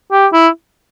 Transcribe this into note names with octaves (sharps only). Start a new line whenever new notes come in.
G4
E4